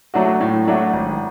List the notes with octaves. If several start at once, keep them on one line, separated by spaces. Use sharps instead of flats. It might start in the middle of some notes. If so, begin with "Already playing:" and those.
F#3 A3 D4 F#4
A2
F#3 A3 D4 F#4
G#1